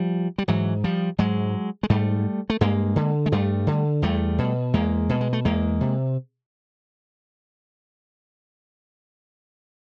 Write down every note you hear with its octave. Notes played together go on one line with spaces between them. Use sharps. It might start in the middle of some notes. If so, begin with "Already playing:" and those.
Already playing: F3 G3
G3
G#2 E3 F#3
F3 G3
G#2 F#3 G#3
G#3
G#2 G3 A3
A3
G2 G#3 A#3
D3
G#3
G2 G3 A3
D3
E2 G3 A3
B2
E2 G#3 A#3
B2
G#3
A3
E2 G#3 A#3
C3